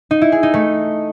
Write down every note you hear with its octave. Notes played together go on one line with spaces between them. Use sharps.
D#4
E4
G#4
D#4
A3